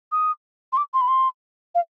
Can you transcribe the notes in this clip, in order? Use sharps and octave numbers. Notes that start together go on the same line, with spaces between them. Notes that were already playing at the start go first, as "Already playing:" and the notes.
D#6
C6
D6
C6
B5
C6
F5